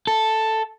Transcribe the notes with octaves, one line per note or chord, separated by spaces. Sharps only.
A4